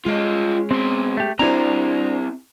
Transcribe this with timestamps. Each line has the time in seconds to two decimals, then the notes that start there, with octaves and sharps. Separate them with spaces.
0.06 G#3 C#4 F4 D#5
0.71 B2 C4 C6
1.17 A3 G4
1.39 C4 D4 E4 F#4 C5 A#5